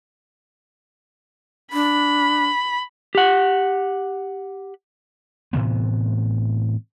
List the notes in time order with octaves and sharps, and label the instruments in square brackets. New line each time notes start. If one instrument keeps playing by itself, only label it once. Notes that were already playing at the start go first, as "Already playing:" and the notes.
[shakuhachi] D4 [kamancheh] B5
[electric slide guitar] G4 F#5
[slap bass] A2 C3 E3 B3